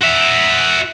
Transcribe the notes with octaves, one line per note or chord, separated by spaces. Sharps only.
F#4 E5